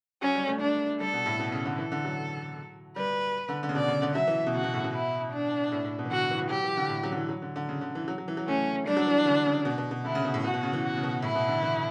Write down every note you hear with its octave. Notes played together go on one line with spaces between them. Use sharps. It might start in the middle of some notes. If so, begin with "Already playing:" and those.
F#3 C#4
G3
A3
D4
G3 A4
B2
A2
B2
C#3
D3
E3 A4
D3
F#3
G3 B4
D3
D3
C#3
B2 D5
C#3
D3
F#3 E5
E3
B2
C#3 F#4
B2
A2
B2
E4
D4
A2
A2
B2
E3
D3 F#4
E3
E3
F#3 G4
E3
D3
A2
F#3
D3
E3
F#3
D3
D3
C#3
D3
E3
F#3
F#3
E3
F#3
A3 C#4
G3 D4
F#3
E3
D3
C#3
B2
B2
B2
D3 E4
C#3
B2
A2
B2 F#4
B2
C#3
E3
F#4
C#3
B2
A2 E4
B2
D3
E3